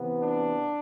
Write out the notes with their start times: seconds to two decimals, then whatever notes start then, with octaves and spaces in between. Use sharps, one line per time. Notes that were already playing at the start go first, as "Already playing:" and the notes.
Already playing: C3 E3 B3
0.18 D4